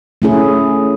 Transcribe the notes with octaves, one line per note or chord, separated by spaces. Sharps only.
A3 C#4 E4 G#4